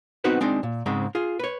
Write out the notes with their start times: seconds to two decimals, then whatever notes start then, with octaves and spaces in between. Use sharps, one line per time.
0.24 B3 C4 D#4 F#4 B4 C5
0.41 G#3 C4 D4 D#4
0.63 A#2
0.86 G#2 C#3 G#3 C4
1.15 F4 G#4
1.39 B4 C#5